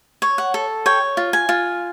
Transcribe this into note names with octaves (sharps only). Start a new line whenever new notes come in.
C#5
F#5
A4
C#5 G5
F4
G#5
F4